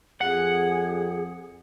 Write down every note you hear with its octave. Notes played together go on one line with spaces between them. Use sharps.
F2 G#4 F#5